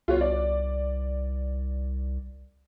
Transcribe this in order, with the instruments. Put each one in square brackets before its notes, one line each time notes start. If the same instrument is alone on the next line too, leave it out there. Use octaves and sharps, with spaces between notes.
[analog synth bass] C2 [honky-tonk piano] F4 F#4 C#5
[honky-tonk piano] D5